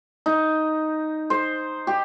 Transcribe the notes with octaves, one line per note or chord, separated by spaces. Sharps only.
D#4
C5
G4